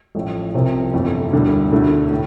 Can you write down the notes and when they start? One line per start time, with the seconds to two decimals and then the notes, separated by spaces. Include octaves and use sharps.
0.15 A1 A2 F3 A3
0.54 C2 C3 F3 C4
0.93 G1 F2 E3 A3
1.32 E1 D2 D3 G3
1.72 E1 D2 D3 A3 E4
2.11 A2